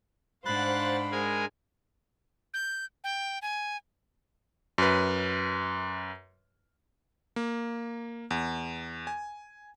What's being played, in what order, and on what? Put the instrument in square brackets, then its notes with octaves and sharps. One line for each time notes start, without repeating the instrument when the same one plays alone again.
[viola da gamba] G#2 D4 [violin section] C5 F5 F#5 [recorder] B5 [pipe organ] F#6 A6
[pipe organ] G#3 A#4 G#5
[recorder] G6
G5
G#5
[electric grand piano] F#2 B4
A#3
E2
G#5